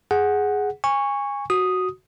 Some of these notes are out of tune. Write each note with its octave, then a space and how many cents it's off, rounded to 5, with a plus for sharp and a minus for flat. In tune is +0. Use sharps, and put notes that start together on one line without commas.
G#4 +0 F#5 +0
G#5 -25 C#6 +0
F#4 +0 D#6 +0